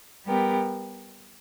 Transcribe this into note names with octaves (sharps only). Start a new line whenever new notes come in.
G3 B3 G4 A#4